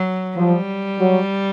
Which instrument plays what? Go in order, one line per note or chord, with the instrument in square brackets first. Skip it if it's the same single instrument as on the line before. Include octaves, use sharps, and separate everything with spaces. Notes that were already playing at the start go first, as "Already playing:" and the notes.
Already playing: [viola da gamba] F#3
[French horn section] F3 [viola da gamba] G3
[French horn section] F#3